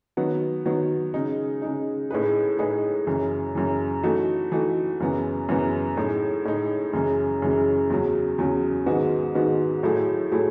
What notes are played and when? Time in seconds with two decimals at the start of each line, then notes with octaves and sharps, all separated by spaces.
0.17 D#3 F#3 B3
0.66 D#3 F#3 B3
1.14 C#3 G#3 D#4
1.62 C#3 G#3 D#4
2.11 A2 G#3 D#4 G#4 B4
2.59 A2 G#3 D#4 G#4 B4
3.07 F#2 C#3 E3
3.55 F#2 C#3 E3
4.03 E3 A3 D#4 F#4
4.52 E3 A3 D#4 F#4
5.00 F#2 C#3 E3 B3
5.49 F#2 C#3 E3 B3
5.97 A2 G#3 D#4
6.45 A2 G#3 D#4
6.93 F#2 C#3 E3 G#3
7.42 F#2 C#3 E3 G#3
7.90 E2 C#3 F#3
8.38 E2 C#3 F#3
8.86 G#2 D#3 G#3 B3 F#4
9.35 G#2 D#3 G#3 B3 F#4
9.83 A2 F#3 A3 E4 G#4
10.31 A2 F#3 A3 E4 G#4